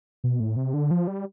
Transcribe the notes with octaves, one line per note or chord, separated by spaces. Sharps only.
B2
A2
C3
D3
F3
G3